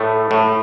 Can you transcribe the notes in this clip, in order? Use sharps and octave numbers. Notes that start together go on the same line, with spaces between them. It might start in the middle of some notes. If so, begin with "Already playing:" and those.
Already playing: A2 A3
A2